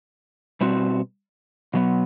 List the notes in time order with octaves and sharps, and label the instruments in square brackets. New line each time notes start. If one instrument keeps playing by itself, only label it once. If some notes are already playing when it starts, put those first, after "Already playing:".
[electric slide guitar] B2 G3 C4 F#4
B2 F#3 B3